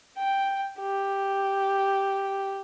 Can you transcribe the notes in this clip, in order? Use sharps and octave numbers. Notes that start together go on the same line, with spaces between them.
G5
G4